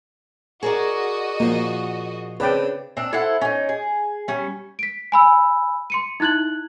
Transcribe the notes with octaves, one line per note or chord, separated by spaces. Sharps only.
F#4 G#4 A#4 D5 D#5
A#2 F3 A#3
C#3 C4 D4 B4 D5 G5
C4 D4
E4 A4 C5 F#5
C#4 D#4
G#4
G3 C#4
B6 D7
G#5 B5 E6
C6 C#7 D#7
D#4 E4 F#6 G#6 F#7